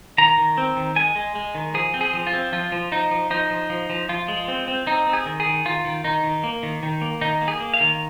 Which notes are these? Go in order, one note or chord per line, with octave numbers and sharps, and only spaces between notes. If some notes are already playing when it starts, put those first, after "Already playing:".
D#3 A#5
D#3
C4
D#3
G#3 G#5
G#3
G#3
D#3
F3 G#4
C4
G#4
F3
F4
C4
F3 F4
F3
F3 D#4
F3
F3 D#4
F3
F3
F3
F3 F4
G#3
C4
C4
C4 D#4
C4
G#4
D#3
G#4
D#3
D#3 F4
D#3
D#3 D#4
D#3
A#3
D#3
D#3
A#3
D#3 D#4
A#3
G#4
A#3
F5
D#3